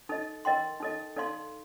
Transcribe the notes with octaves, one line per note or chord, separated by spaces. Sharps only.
D#4 A4 D#5
A#4 D#5 G5 C6
D#4 A4 D#5
D#4 A4 D5 F5 C6